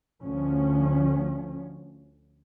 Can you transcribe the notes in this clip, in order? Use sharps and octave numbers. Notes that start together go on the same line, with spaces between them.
D2 D3 F3 C#4